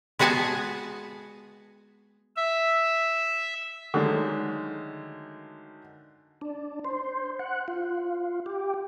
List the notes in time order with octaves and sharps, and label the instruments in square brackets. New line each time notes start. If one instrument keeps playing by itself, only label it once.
[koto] G#3 B3 F#4 G#4 G#5 A5
[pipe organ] E5
[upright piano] D3 D#3 F#3 G#3 A3
[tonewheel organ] D4
C5
F#5
F4
G4